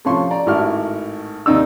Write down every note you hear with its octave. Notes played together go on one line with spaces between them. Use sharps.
A2 C3 F3 C#4 C6 C#6
D5 A#5
G#1 A2 E4 F#4 D6 F6
D#2 C3 D#4 D5 E6